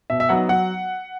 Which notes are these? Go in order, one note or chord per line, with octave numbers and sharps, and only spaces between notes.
B2 E5
E5
F#3 B3 D#4 F#5
F#3 F#5